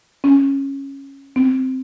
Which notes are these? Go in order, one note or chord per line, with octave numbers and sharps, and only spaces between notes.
C#4
C4